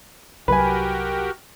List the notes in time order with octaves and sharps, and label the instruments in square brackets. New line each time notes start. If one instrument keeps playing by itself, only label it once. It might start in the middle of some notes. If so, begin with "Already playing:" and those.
[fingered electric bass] C2 F#3 [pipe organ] F#4 G4 A#4 [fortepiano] B4 G#5